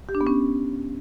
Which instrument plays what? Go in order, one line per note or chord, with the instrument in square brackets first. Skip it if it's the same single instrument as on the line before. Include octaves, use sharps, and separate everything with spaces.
[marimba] G4
D4
B3
C#4